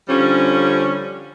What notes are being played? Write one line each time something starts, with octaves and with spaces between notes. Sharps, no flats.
D3 F3 G3 C#4